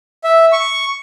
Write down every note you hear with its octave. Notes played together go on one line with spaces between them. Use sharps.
E5
C#6